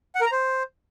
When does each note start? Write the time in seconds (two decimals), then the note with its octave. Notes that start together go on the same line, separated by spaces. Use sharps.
0.15 F#5
0.21 A#4
0.26 A#5
0.32 C5